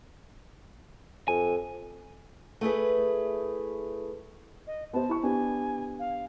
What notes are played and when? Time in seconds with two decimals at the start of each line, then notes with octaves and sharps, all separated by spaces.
1.28 F2 G#5
2.61 A3 E4 G#4 B4
4.67 D#5
4.93 B3 C5 A5
5.09 E4 C#6
5.23 B3 D4 G4 G#5
5.99 F5